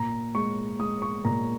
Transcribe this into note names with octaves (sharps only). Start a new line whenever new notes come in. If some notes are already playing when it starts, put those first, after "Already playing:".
Already playing: A#2 A#5
G#3 C#6
G#3 D#6
C#6
A#2 A#5